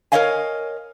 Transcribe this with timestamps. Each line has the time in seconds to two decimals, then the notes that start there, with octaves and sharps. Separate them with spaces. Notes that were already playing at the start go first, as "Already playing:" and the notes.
0.12 A#4 C5 C#5 D#5 F5 G#5